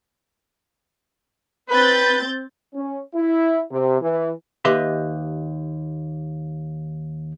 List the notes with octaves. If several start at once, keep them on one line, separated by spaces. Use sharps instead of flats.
C4 B4 G6 A6
C#4
E4
C3
E3
D#2 G4 B4 D#5 E5 C6